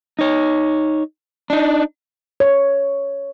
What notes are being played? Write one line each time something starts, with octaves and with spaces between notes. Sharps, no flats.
D#4 C#5
D4 D#4
C#5